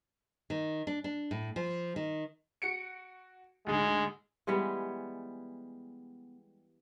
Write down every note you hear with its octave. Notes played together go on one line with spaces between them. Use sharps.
D#3
D4
D4
A2
F3
D#3
F#4 C#7 D7
D2 G#2 D3 G#3
E3 G3 G#3 B3